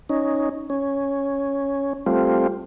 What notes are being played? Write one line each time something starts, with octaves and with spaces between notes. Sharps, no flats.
C#4 D#4
C#4
G3 A3 C4 F4